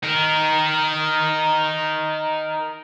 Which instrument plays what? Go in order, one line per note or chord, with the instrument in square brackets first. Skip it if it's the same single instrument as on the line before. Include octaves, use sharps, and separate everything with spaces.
[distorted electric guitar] D#4 A#4